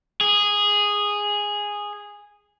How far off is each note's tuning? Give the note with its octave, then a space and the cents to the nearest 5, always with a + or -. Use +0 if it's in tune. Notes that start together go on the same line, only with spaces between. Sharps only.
G#4 -10